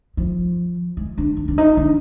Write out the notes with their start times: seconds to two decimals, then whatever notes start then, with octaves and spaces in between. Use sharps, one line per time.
0.17 F3
0.97 G#3
1.18 D4
1.37 D4
1.48 D4
1.58 D#4
1.77 D4